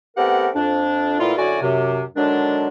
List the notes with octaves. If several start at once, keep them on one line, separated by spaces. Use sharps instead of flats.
A3 B3 C4 G4 A#4 F#5
F2 D4
A#2 A3 B3 E4 F4
F#2 D3 E4 F#4 D5 G#5
F#2 C3
D3 D#3 F#3 G#3 D4